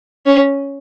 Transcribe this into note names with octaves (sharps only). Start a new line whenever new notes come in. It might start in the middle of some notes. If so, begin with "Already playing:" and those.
C#4